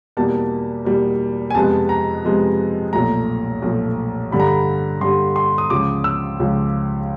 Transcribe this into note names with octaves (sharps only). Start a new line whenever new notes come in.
E2 B2 G3 A#3 A5
E2 B2 G3 A#3
G#5
F2 C3 F3 G#3 B3 A5
A#5
F2 C3 F3 G#3 B3
B1 A#2 F3 A3 A#5
B1 A#2 F3 A3
G2 D3 G3 B5
A#5
B5
G2 D3 G3 C6
C6
D#6
C#2 C#3 F3 D6
E6
C#2 C#3 F3